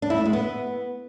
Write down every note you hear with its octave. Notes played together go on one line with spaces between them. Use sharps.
D4
E4
A3
G#3
B3